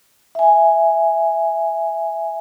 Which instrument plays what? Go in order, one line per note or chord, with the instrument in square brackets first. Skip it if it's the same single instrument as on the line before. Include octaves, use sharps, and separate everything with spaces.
[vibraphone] E5 G#5